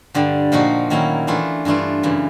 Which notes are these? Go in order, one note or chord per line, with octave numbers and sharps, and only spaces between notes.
G2 D3 G3
A#2 F3 A#3 D#4 F#4
D#3 F#3 A#3 C#4 E4
E3 A3 D4 F4
G2 E3 A3 D4 F4
F#2 C#3 E3